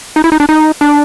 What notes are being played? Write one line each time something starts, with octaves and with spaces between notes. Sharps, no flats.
D#4
E4
D#4
D4
D#4
D4